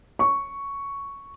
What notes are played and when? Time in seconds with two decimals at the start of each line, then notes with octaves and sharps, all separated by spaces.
0.19 C#6